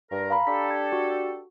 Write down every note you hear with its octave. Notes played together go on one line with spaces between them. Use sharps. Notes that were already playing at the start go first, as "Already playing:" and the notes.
G2 A#4
F5 A#5 B5
D4 G4 A4 B6
G#6
F#4